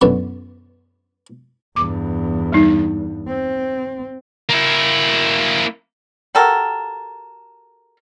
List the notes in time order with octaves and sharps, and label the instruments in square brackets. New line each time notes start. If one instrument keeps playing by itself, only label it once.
[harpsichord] F#2 B2 D3 E3 A3 B3
[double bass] E2 G2 [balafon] D6
[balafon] G3 D#4
[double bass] C4
[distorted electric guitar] A#3 E4
[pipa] F#4 G4 A4 A#4